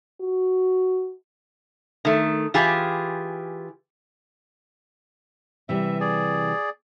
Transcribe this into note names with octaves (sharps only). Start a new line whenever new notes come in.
F#4
D#3 A3
E3 F4 G4 G#4
C3 E3 G3 E5
G#4 D5